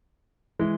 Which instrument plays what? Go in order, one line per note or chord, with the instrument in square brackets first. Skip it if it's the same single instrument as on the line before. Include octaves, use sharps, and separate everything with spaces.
[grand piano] E3 G#3